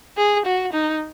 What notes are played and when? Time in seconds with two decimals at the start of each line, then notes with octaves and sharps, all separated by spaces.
0.17 G#4
0.46 F#4
0.73 D#4